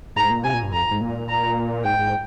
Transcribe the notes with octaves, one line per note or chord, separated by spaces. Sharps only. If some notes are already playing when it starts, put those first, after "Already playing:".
G#2 A#5
A#2
C3 G#5
A#2
G2
F2 A#5
G#2
A#2
A#5
G#2 G5
G#2